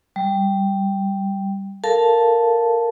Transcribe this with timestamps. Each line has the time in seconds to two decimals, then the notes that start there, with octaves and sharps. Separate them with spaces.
0.16 G3
1.84 A4 A#4 F5 A5